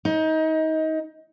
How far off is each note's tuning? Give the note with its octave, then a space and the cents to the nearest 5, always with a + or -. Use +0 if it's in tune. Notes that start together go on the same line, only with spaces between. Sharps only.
D#4 +25